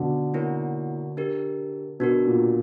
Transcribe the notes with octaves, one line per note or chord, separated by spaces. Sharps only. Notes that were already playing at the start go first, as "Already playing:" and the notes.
Already playing: B2 D3
A#3 E4 A#4 C#5 F#5
D4 G4 A#4
B2 D4 F#4 A#4
A#2